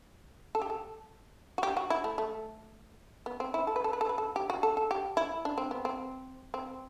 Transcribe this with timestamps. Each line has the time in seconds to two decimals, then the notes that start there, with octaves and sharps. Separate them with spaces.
0.55 A4
0.62 G4
0.70 A4
1.58 F#4
1.63 G4
1.77 F#4
1.90 E4
2.04 A3
2.18 A3
3.26 B3
3.40 C4
3.54 E4
3.67 A4
3.76 B4
3.84 A4
3.93 B4
4.01 A4
4.09 B4
4.18 A4
4.36 G4
4.50 F#4
4.63 A4
4.77 A4
4.91 G4
5.17 E4
5.45 D4
5.58 C4
5.71 B3
5.85 C4
6.54 C4